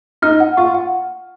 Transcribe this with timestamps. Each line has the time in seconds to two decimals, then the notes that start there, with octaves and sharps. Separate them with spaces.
0.22 D#4 F6
0.40 F#5
0.57 F4 C#6
0.75 F#5